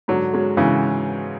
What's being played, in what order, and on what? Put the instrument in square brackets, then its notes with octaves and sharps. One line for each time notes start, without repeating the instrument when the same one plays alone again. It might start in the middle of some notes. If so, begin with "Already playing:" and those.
[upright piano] G#2 [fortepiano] D3 F#3
[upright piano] G#3 C#4 F#4
[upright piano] G#2 [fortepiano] C#3 E3